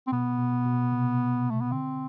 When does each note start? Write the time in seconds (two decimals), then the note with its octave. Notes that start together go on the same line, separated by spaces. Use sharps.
0.07 C4
0.12 B2 B3
0.38 B2
0.65 B2
0.92 C3
1.51 A3
1.61 B3
1.71 D3 C4